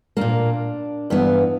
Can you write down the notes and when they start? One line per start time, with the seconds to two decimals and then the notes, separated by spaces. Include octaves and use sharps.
0.17 A#2 A#3 D4
1.10 G2 E3 B3